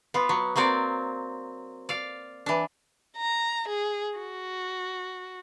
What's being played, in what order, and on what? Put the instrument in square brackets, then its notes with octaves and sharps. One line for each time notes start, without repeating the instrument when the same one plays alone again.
[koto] B3 F4
F#3
F#3 A#3 C4 D5
D5 F5
E3 D4
[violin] A#5
G#4
F#4